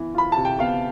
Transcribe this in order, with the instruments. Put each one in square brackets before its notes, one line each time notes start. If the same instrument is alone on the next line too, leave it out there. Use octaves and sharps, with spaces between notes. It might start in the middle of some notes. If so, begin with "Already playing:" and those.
Already playing: [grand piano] E3 B3
[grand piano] F4 [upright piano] B5
[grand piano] C3 [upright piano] A5
[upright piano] G5
[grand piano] B3 [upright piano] F5